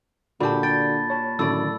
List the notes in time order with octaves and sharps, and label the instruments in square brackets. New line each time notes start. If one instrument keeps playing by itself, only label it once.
[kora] A#2 G4 [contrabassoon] D3 [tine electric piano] F#4 [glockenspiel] A5 B5
[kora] G5 [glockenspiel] A6
[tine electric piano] C#5 A5
[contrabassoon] F#2 [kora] A2 D5 [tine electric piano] D3 D#3 [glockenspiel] E6